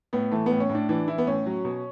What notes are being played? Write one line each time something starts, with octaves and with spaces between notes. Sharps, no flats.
A2 B3
E3 A3
B3
A2
C#4
A2
D4
E3 D4
E3 E4
B3
A2 C#4
F#3
B2